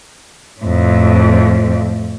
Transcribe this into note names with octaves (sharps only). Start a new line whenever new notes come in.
F2 A2